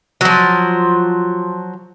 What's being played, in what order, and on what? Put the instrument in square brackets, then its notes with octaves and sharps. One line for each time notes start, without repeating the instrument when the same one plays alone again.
[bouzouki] F3 F#3